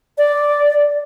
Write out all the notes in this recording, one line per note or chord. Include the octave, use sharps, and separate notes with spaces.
D5